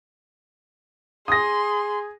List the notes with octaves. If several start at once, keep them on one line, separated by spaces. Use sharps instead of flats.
G#4 C6 D#6 A#6